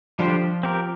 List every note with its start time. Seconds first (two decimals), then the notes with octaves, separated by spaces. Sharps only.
0.19 D3 F3 G3 D4 G4 C5
0.63 C4 G4 A#4